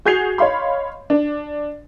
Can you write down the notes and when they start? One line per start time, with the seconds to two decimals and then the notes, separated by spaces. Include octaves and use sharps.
0.05 F#4 G#4 G6 G#6 C7 F7
0.38 C#5 D#5 F5 B5 C6
1.10 D4